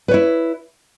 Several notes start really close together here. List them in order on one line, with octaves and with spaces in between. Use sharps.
B4 C#5 E4